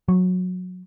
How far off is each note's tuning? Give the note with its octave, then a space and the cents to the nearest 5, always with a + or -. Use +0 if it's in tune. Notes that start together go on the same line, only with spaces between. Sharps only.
F#3 -20